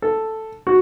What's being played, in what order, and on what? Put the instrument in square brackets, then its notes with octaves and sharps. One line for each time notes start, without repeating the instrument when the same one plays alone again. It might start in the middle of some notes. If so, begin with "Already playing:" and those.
[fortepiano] A4
F#4